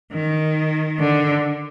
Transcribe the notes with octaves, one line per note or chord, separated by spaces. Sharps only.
D#3
D3